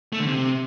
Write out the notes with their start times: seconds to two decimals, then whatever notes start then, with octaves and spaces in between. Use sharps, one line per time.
0.13 A3
0.20 D3
0.27 C3